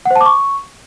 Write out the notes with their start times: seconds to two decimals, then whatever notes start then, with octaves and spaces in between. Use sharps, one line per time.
0.05 F#5
0.11 C5
0.16 A5
0.21 D6
0.26 C#6